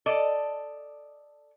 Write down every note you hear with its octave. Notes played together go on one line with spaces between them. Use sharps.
A4 D5 D#5